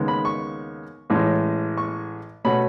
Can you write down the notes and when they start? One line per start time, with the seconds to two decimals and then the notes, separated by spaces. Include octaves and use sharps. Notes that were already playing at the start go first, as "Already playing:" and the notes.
Already playing: D#2 C#3 G#3 B3
0.08 B5
0.25 C#6
1.10 A1 A2 G#3 C#4
1.77 C#6
2.44 B2 A3 C#4 B5